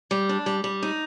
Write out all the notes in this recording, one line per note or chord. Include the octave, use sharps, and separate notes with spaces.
G3
D4
G3
G3
D#4